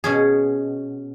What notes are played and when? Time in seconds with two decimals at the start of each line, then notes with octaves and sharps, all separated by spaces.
0.04 B2 C#4 G#4